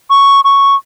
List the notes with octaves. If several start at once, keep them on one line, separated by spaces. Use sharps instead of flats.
C#6
C#6